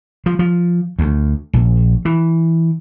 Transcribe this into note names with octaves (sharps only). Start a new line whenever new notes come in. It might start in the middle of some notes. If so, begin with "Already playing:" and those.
F3
F3
D2
A#1
E3